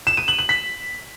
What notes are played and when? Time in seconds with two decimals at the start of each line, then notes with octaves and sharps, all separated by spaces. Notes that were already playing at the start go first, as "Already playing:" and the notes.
0.07 E7
0.17 D#7
0.28 F#7
0.38 F#7
0.49 B6